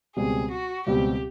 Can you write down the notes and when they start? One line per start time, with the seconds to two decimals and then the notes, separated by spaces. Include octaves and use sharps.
0.16 C#2 B2 G3 C4 G#4
0.51 F#4
0.86 C#2 B2 G3 C4 G4